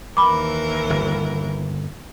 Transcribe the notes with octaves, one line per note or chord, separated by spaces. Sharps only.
D#2 E3 A#4 B5 D6
G1